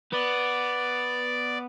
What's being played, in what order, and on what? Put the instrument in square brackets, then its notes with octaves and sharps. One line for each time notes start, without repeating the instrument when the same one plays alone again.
[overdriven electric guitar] B3 B4 [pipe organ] D5